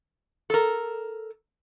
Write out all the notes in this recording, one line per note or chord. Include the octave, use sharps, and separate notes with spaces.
A4 A#4